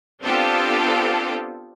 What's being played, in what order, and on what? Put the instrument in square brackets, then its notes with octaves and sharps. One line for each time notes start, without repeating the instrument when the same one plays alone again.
[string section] B3 C4 D4 F4 G4 A4